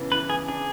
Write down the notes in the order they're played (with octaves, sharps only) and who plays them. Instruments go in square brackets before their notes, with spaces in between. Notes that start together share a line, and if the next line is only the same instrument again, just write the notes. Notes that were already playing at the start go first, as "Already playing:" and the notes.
Already playing: [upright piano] C#3 E3 B3 D4
[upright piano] E3 [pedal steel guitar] B4
[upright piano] B3 [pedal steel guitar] G#4
[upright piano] D4 [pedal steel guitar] G#4